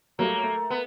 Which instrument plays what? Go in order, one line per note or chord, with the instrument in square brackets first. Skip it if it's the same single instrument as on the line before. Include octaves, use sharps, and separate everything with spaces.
[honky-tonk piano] F#3 G3 A3 [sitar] A#3 [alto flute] A#5
[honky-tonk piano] A3
[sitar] B3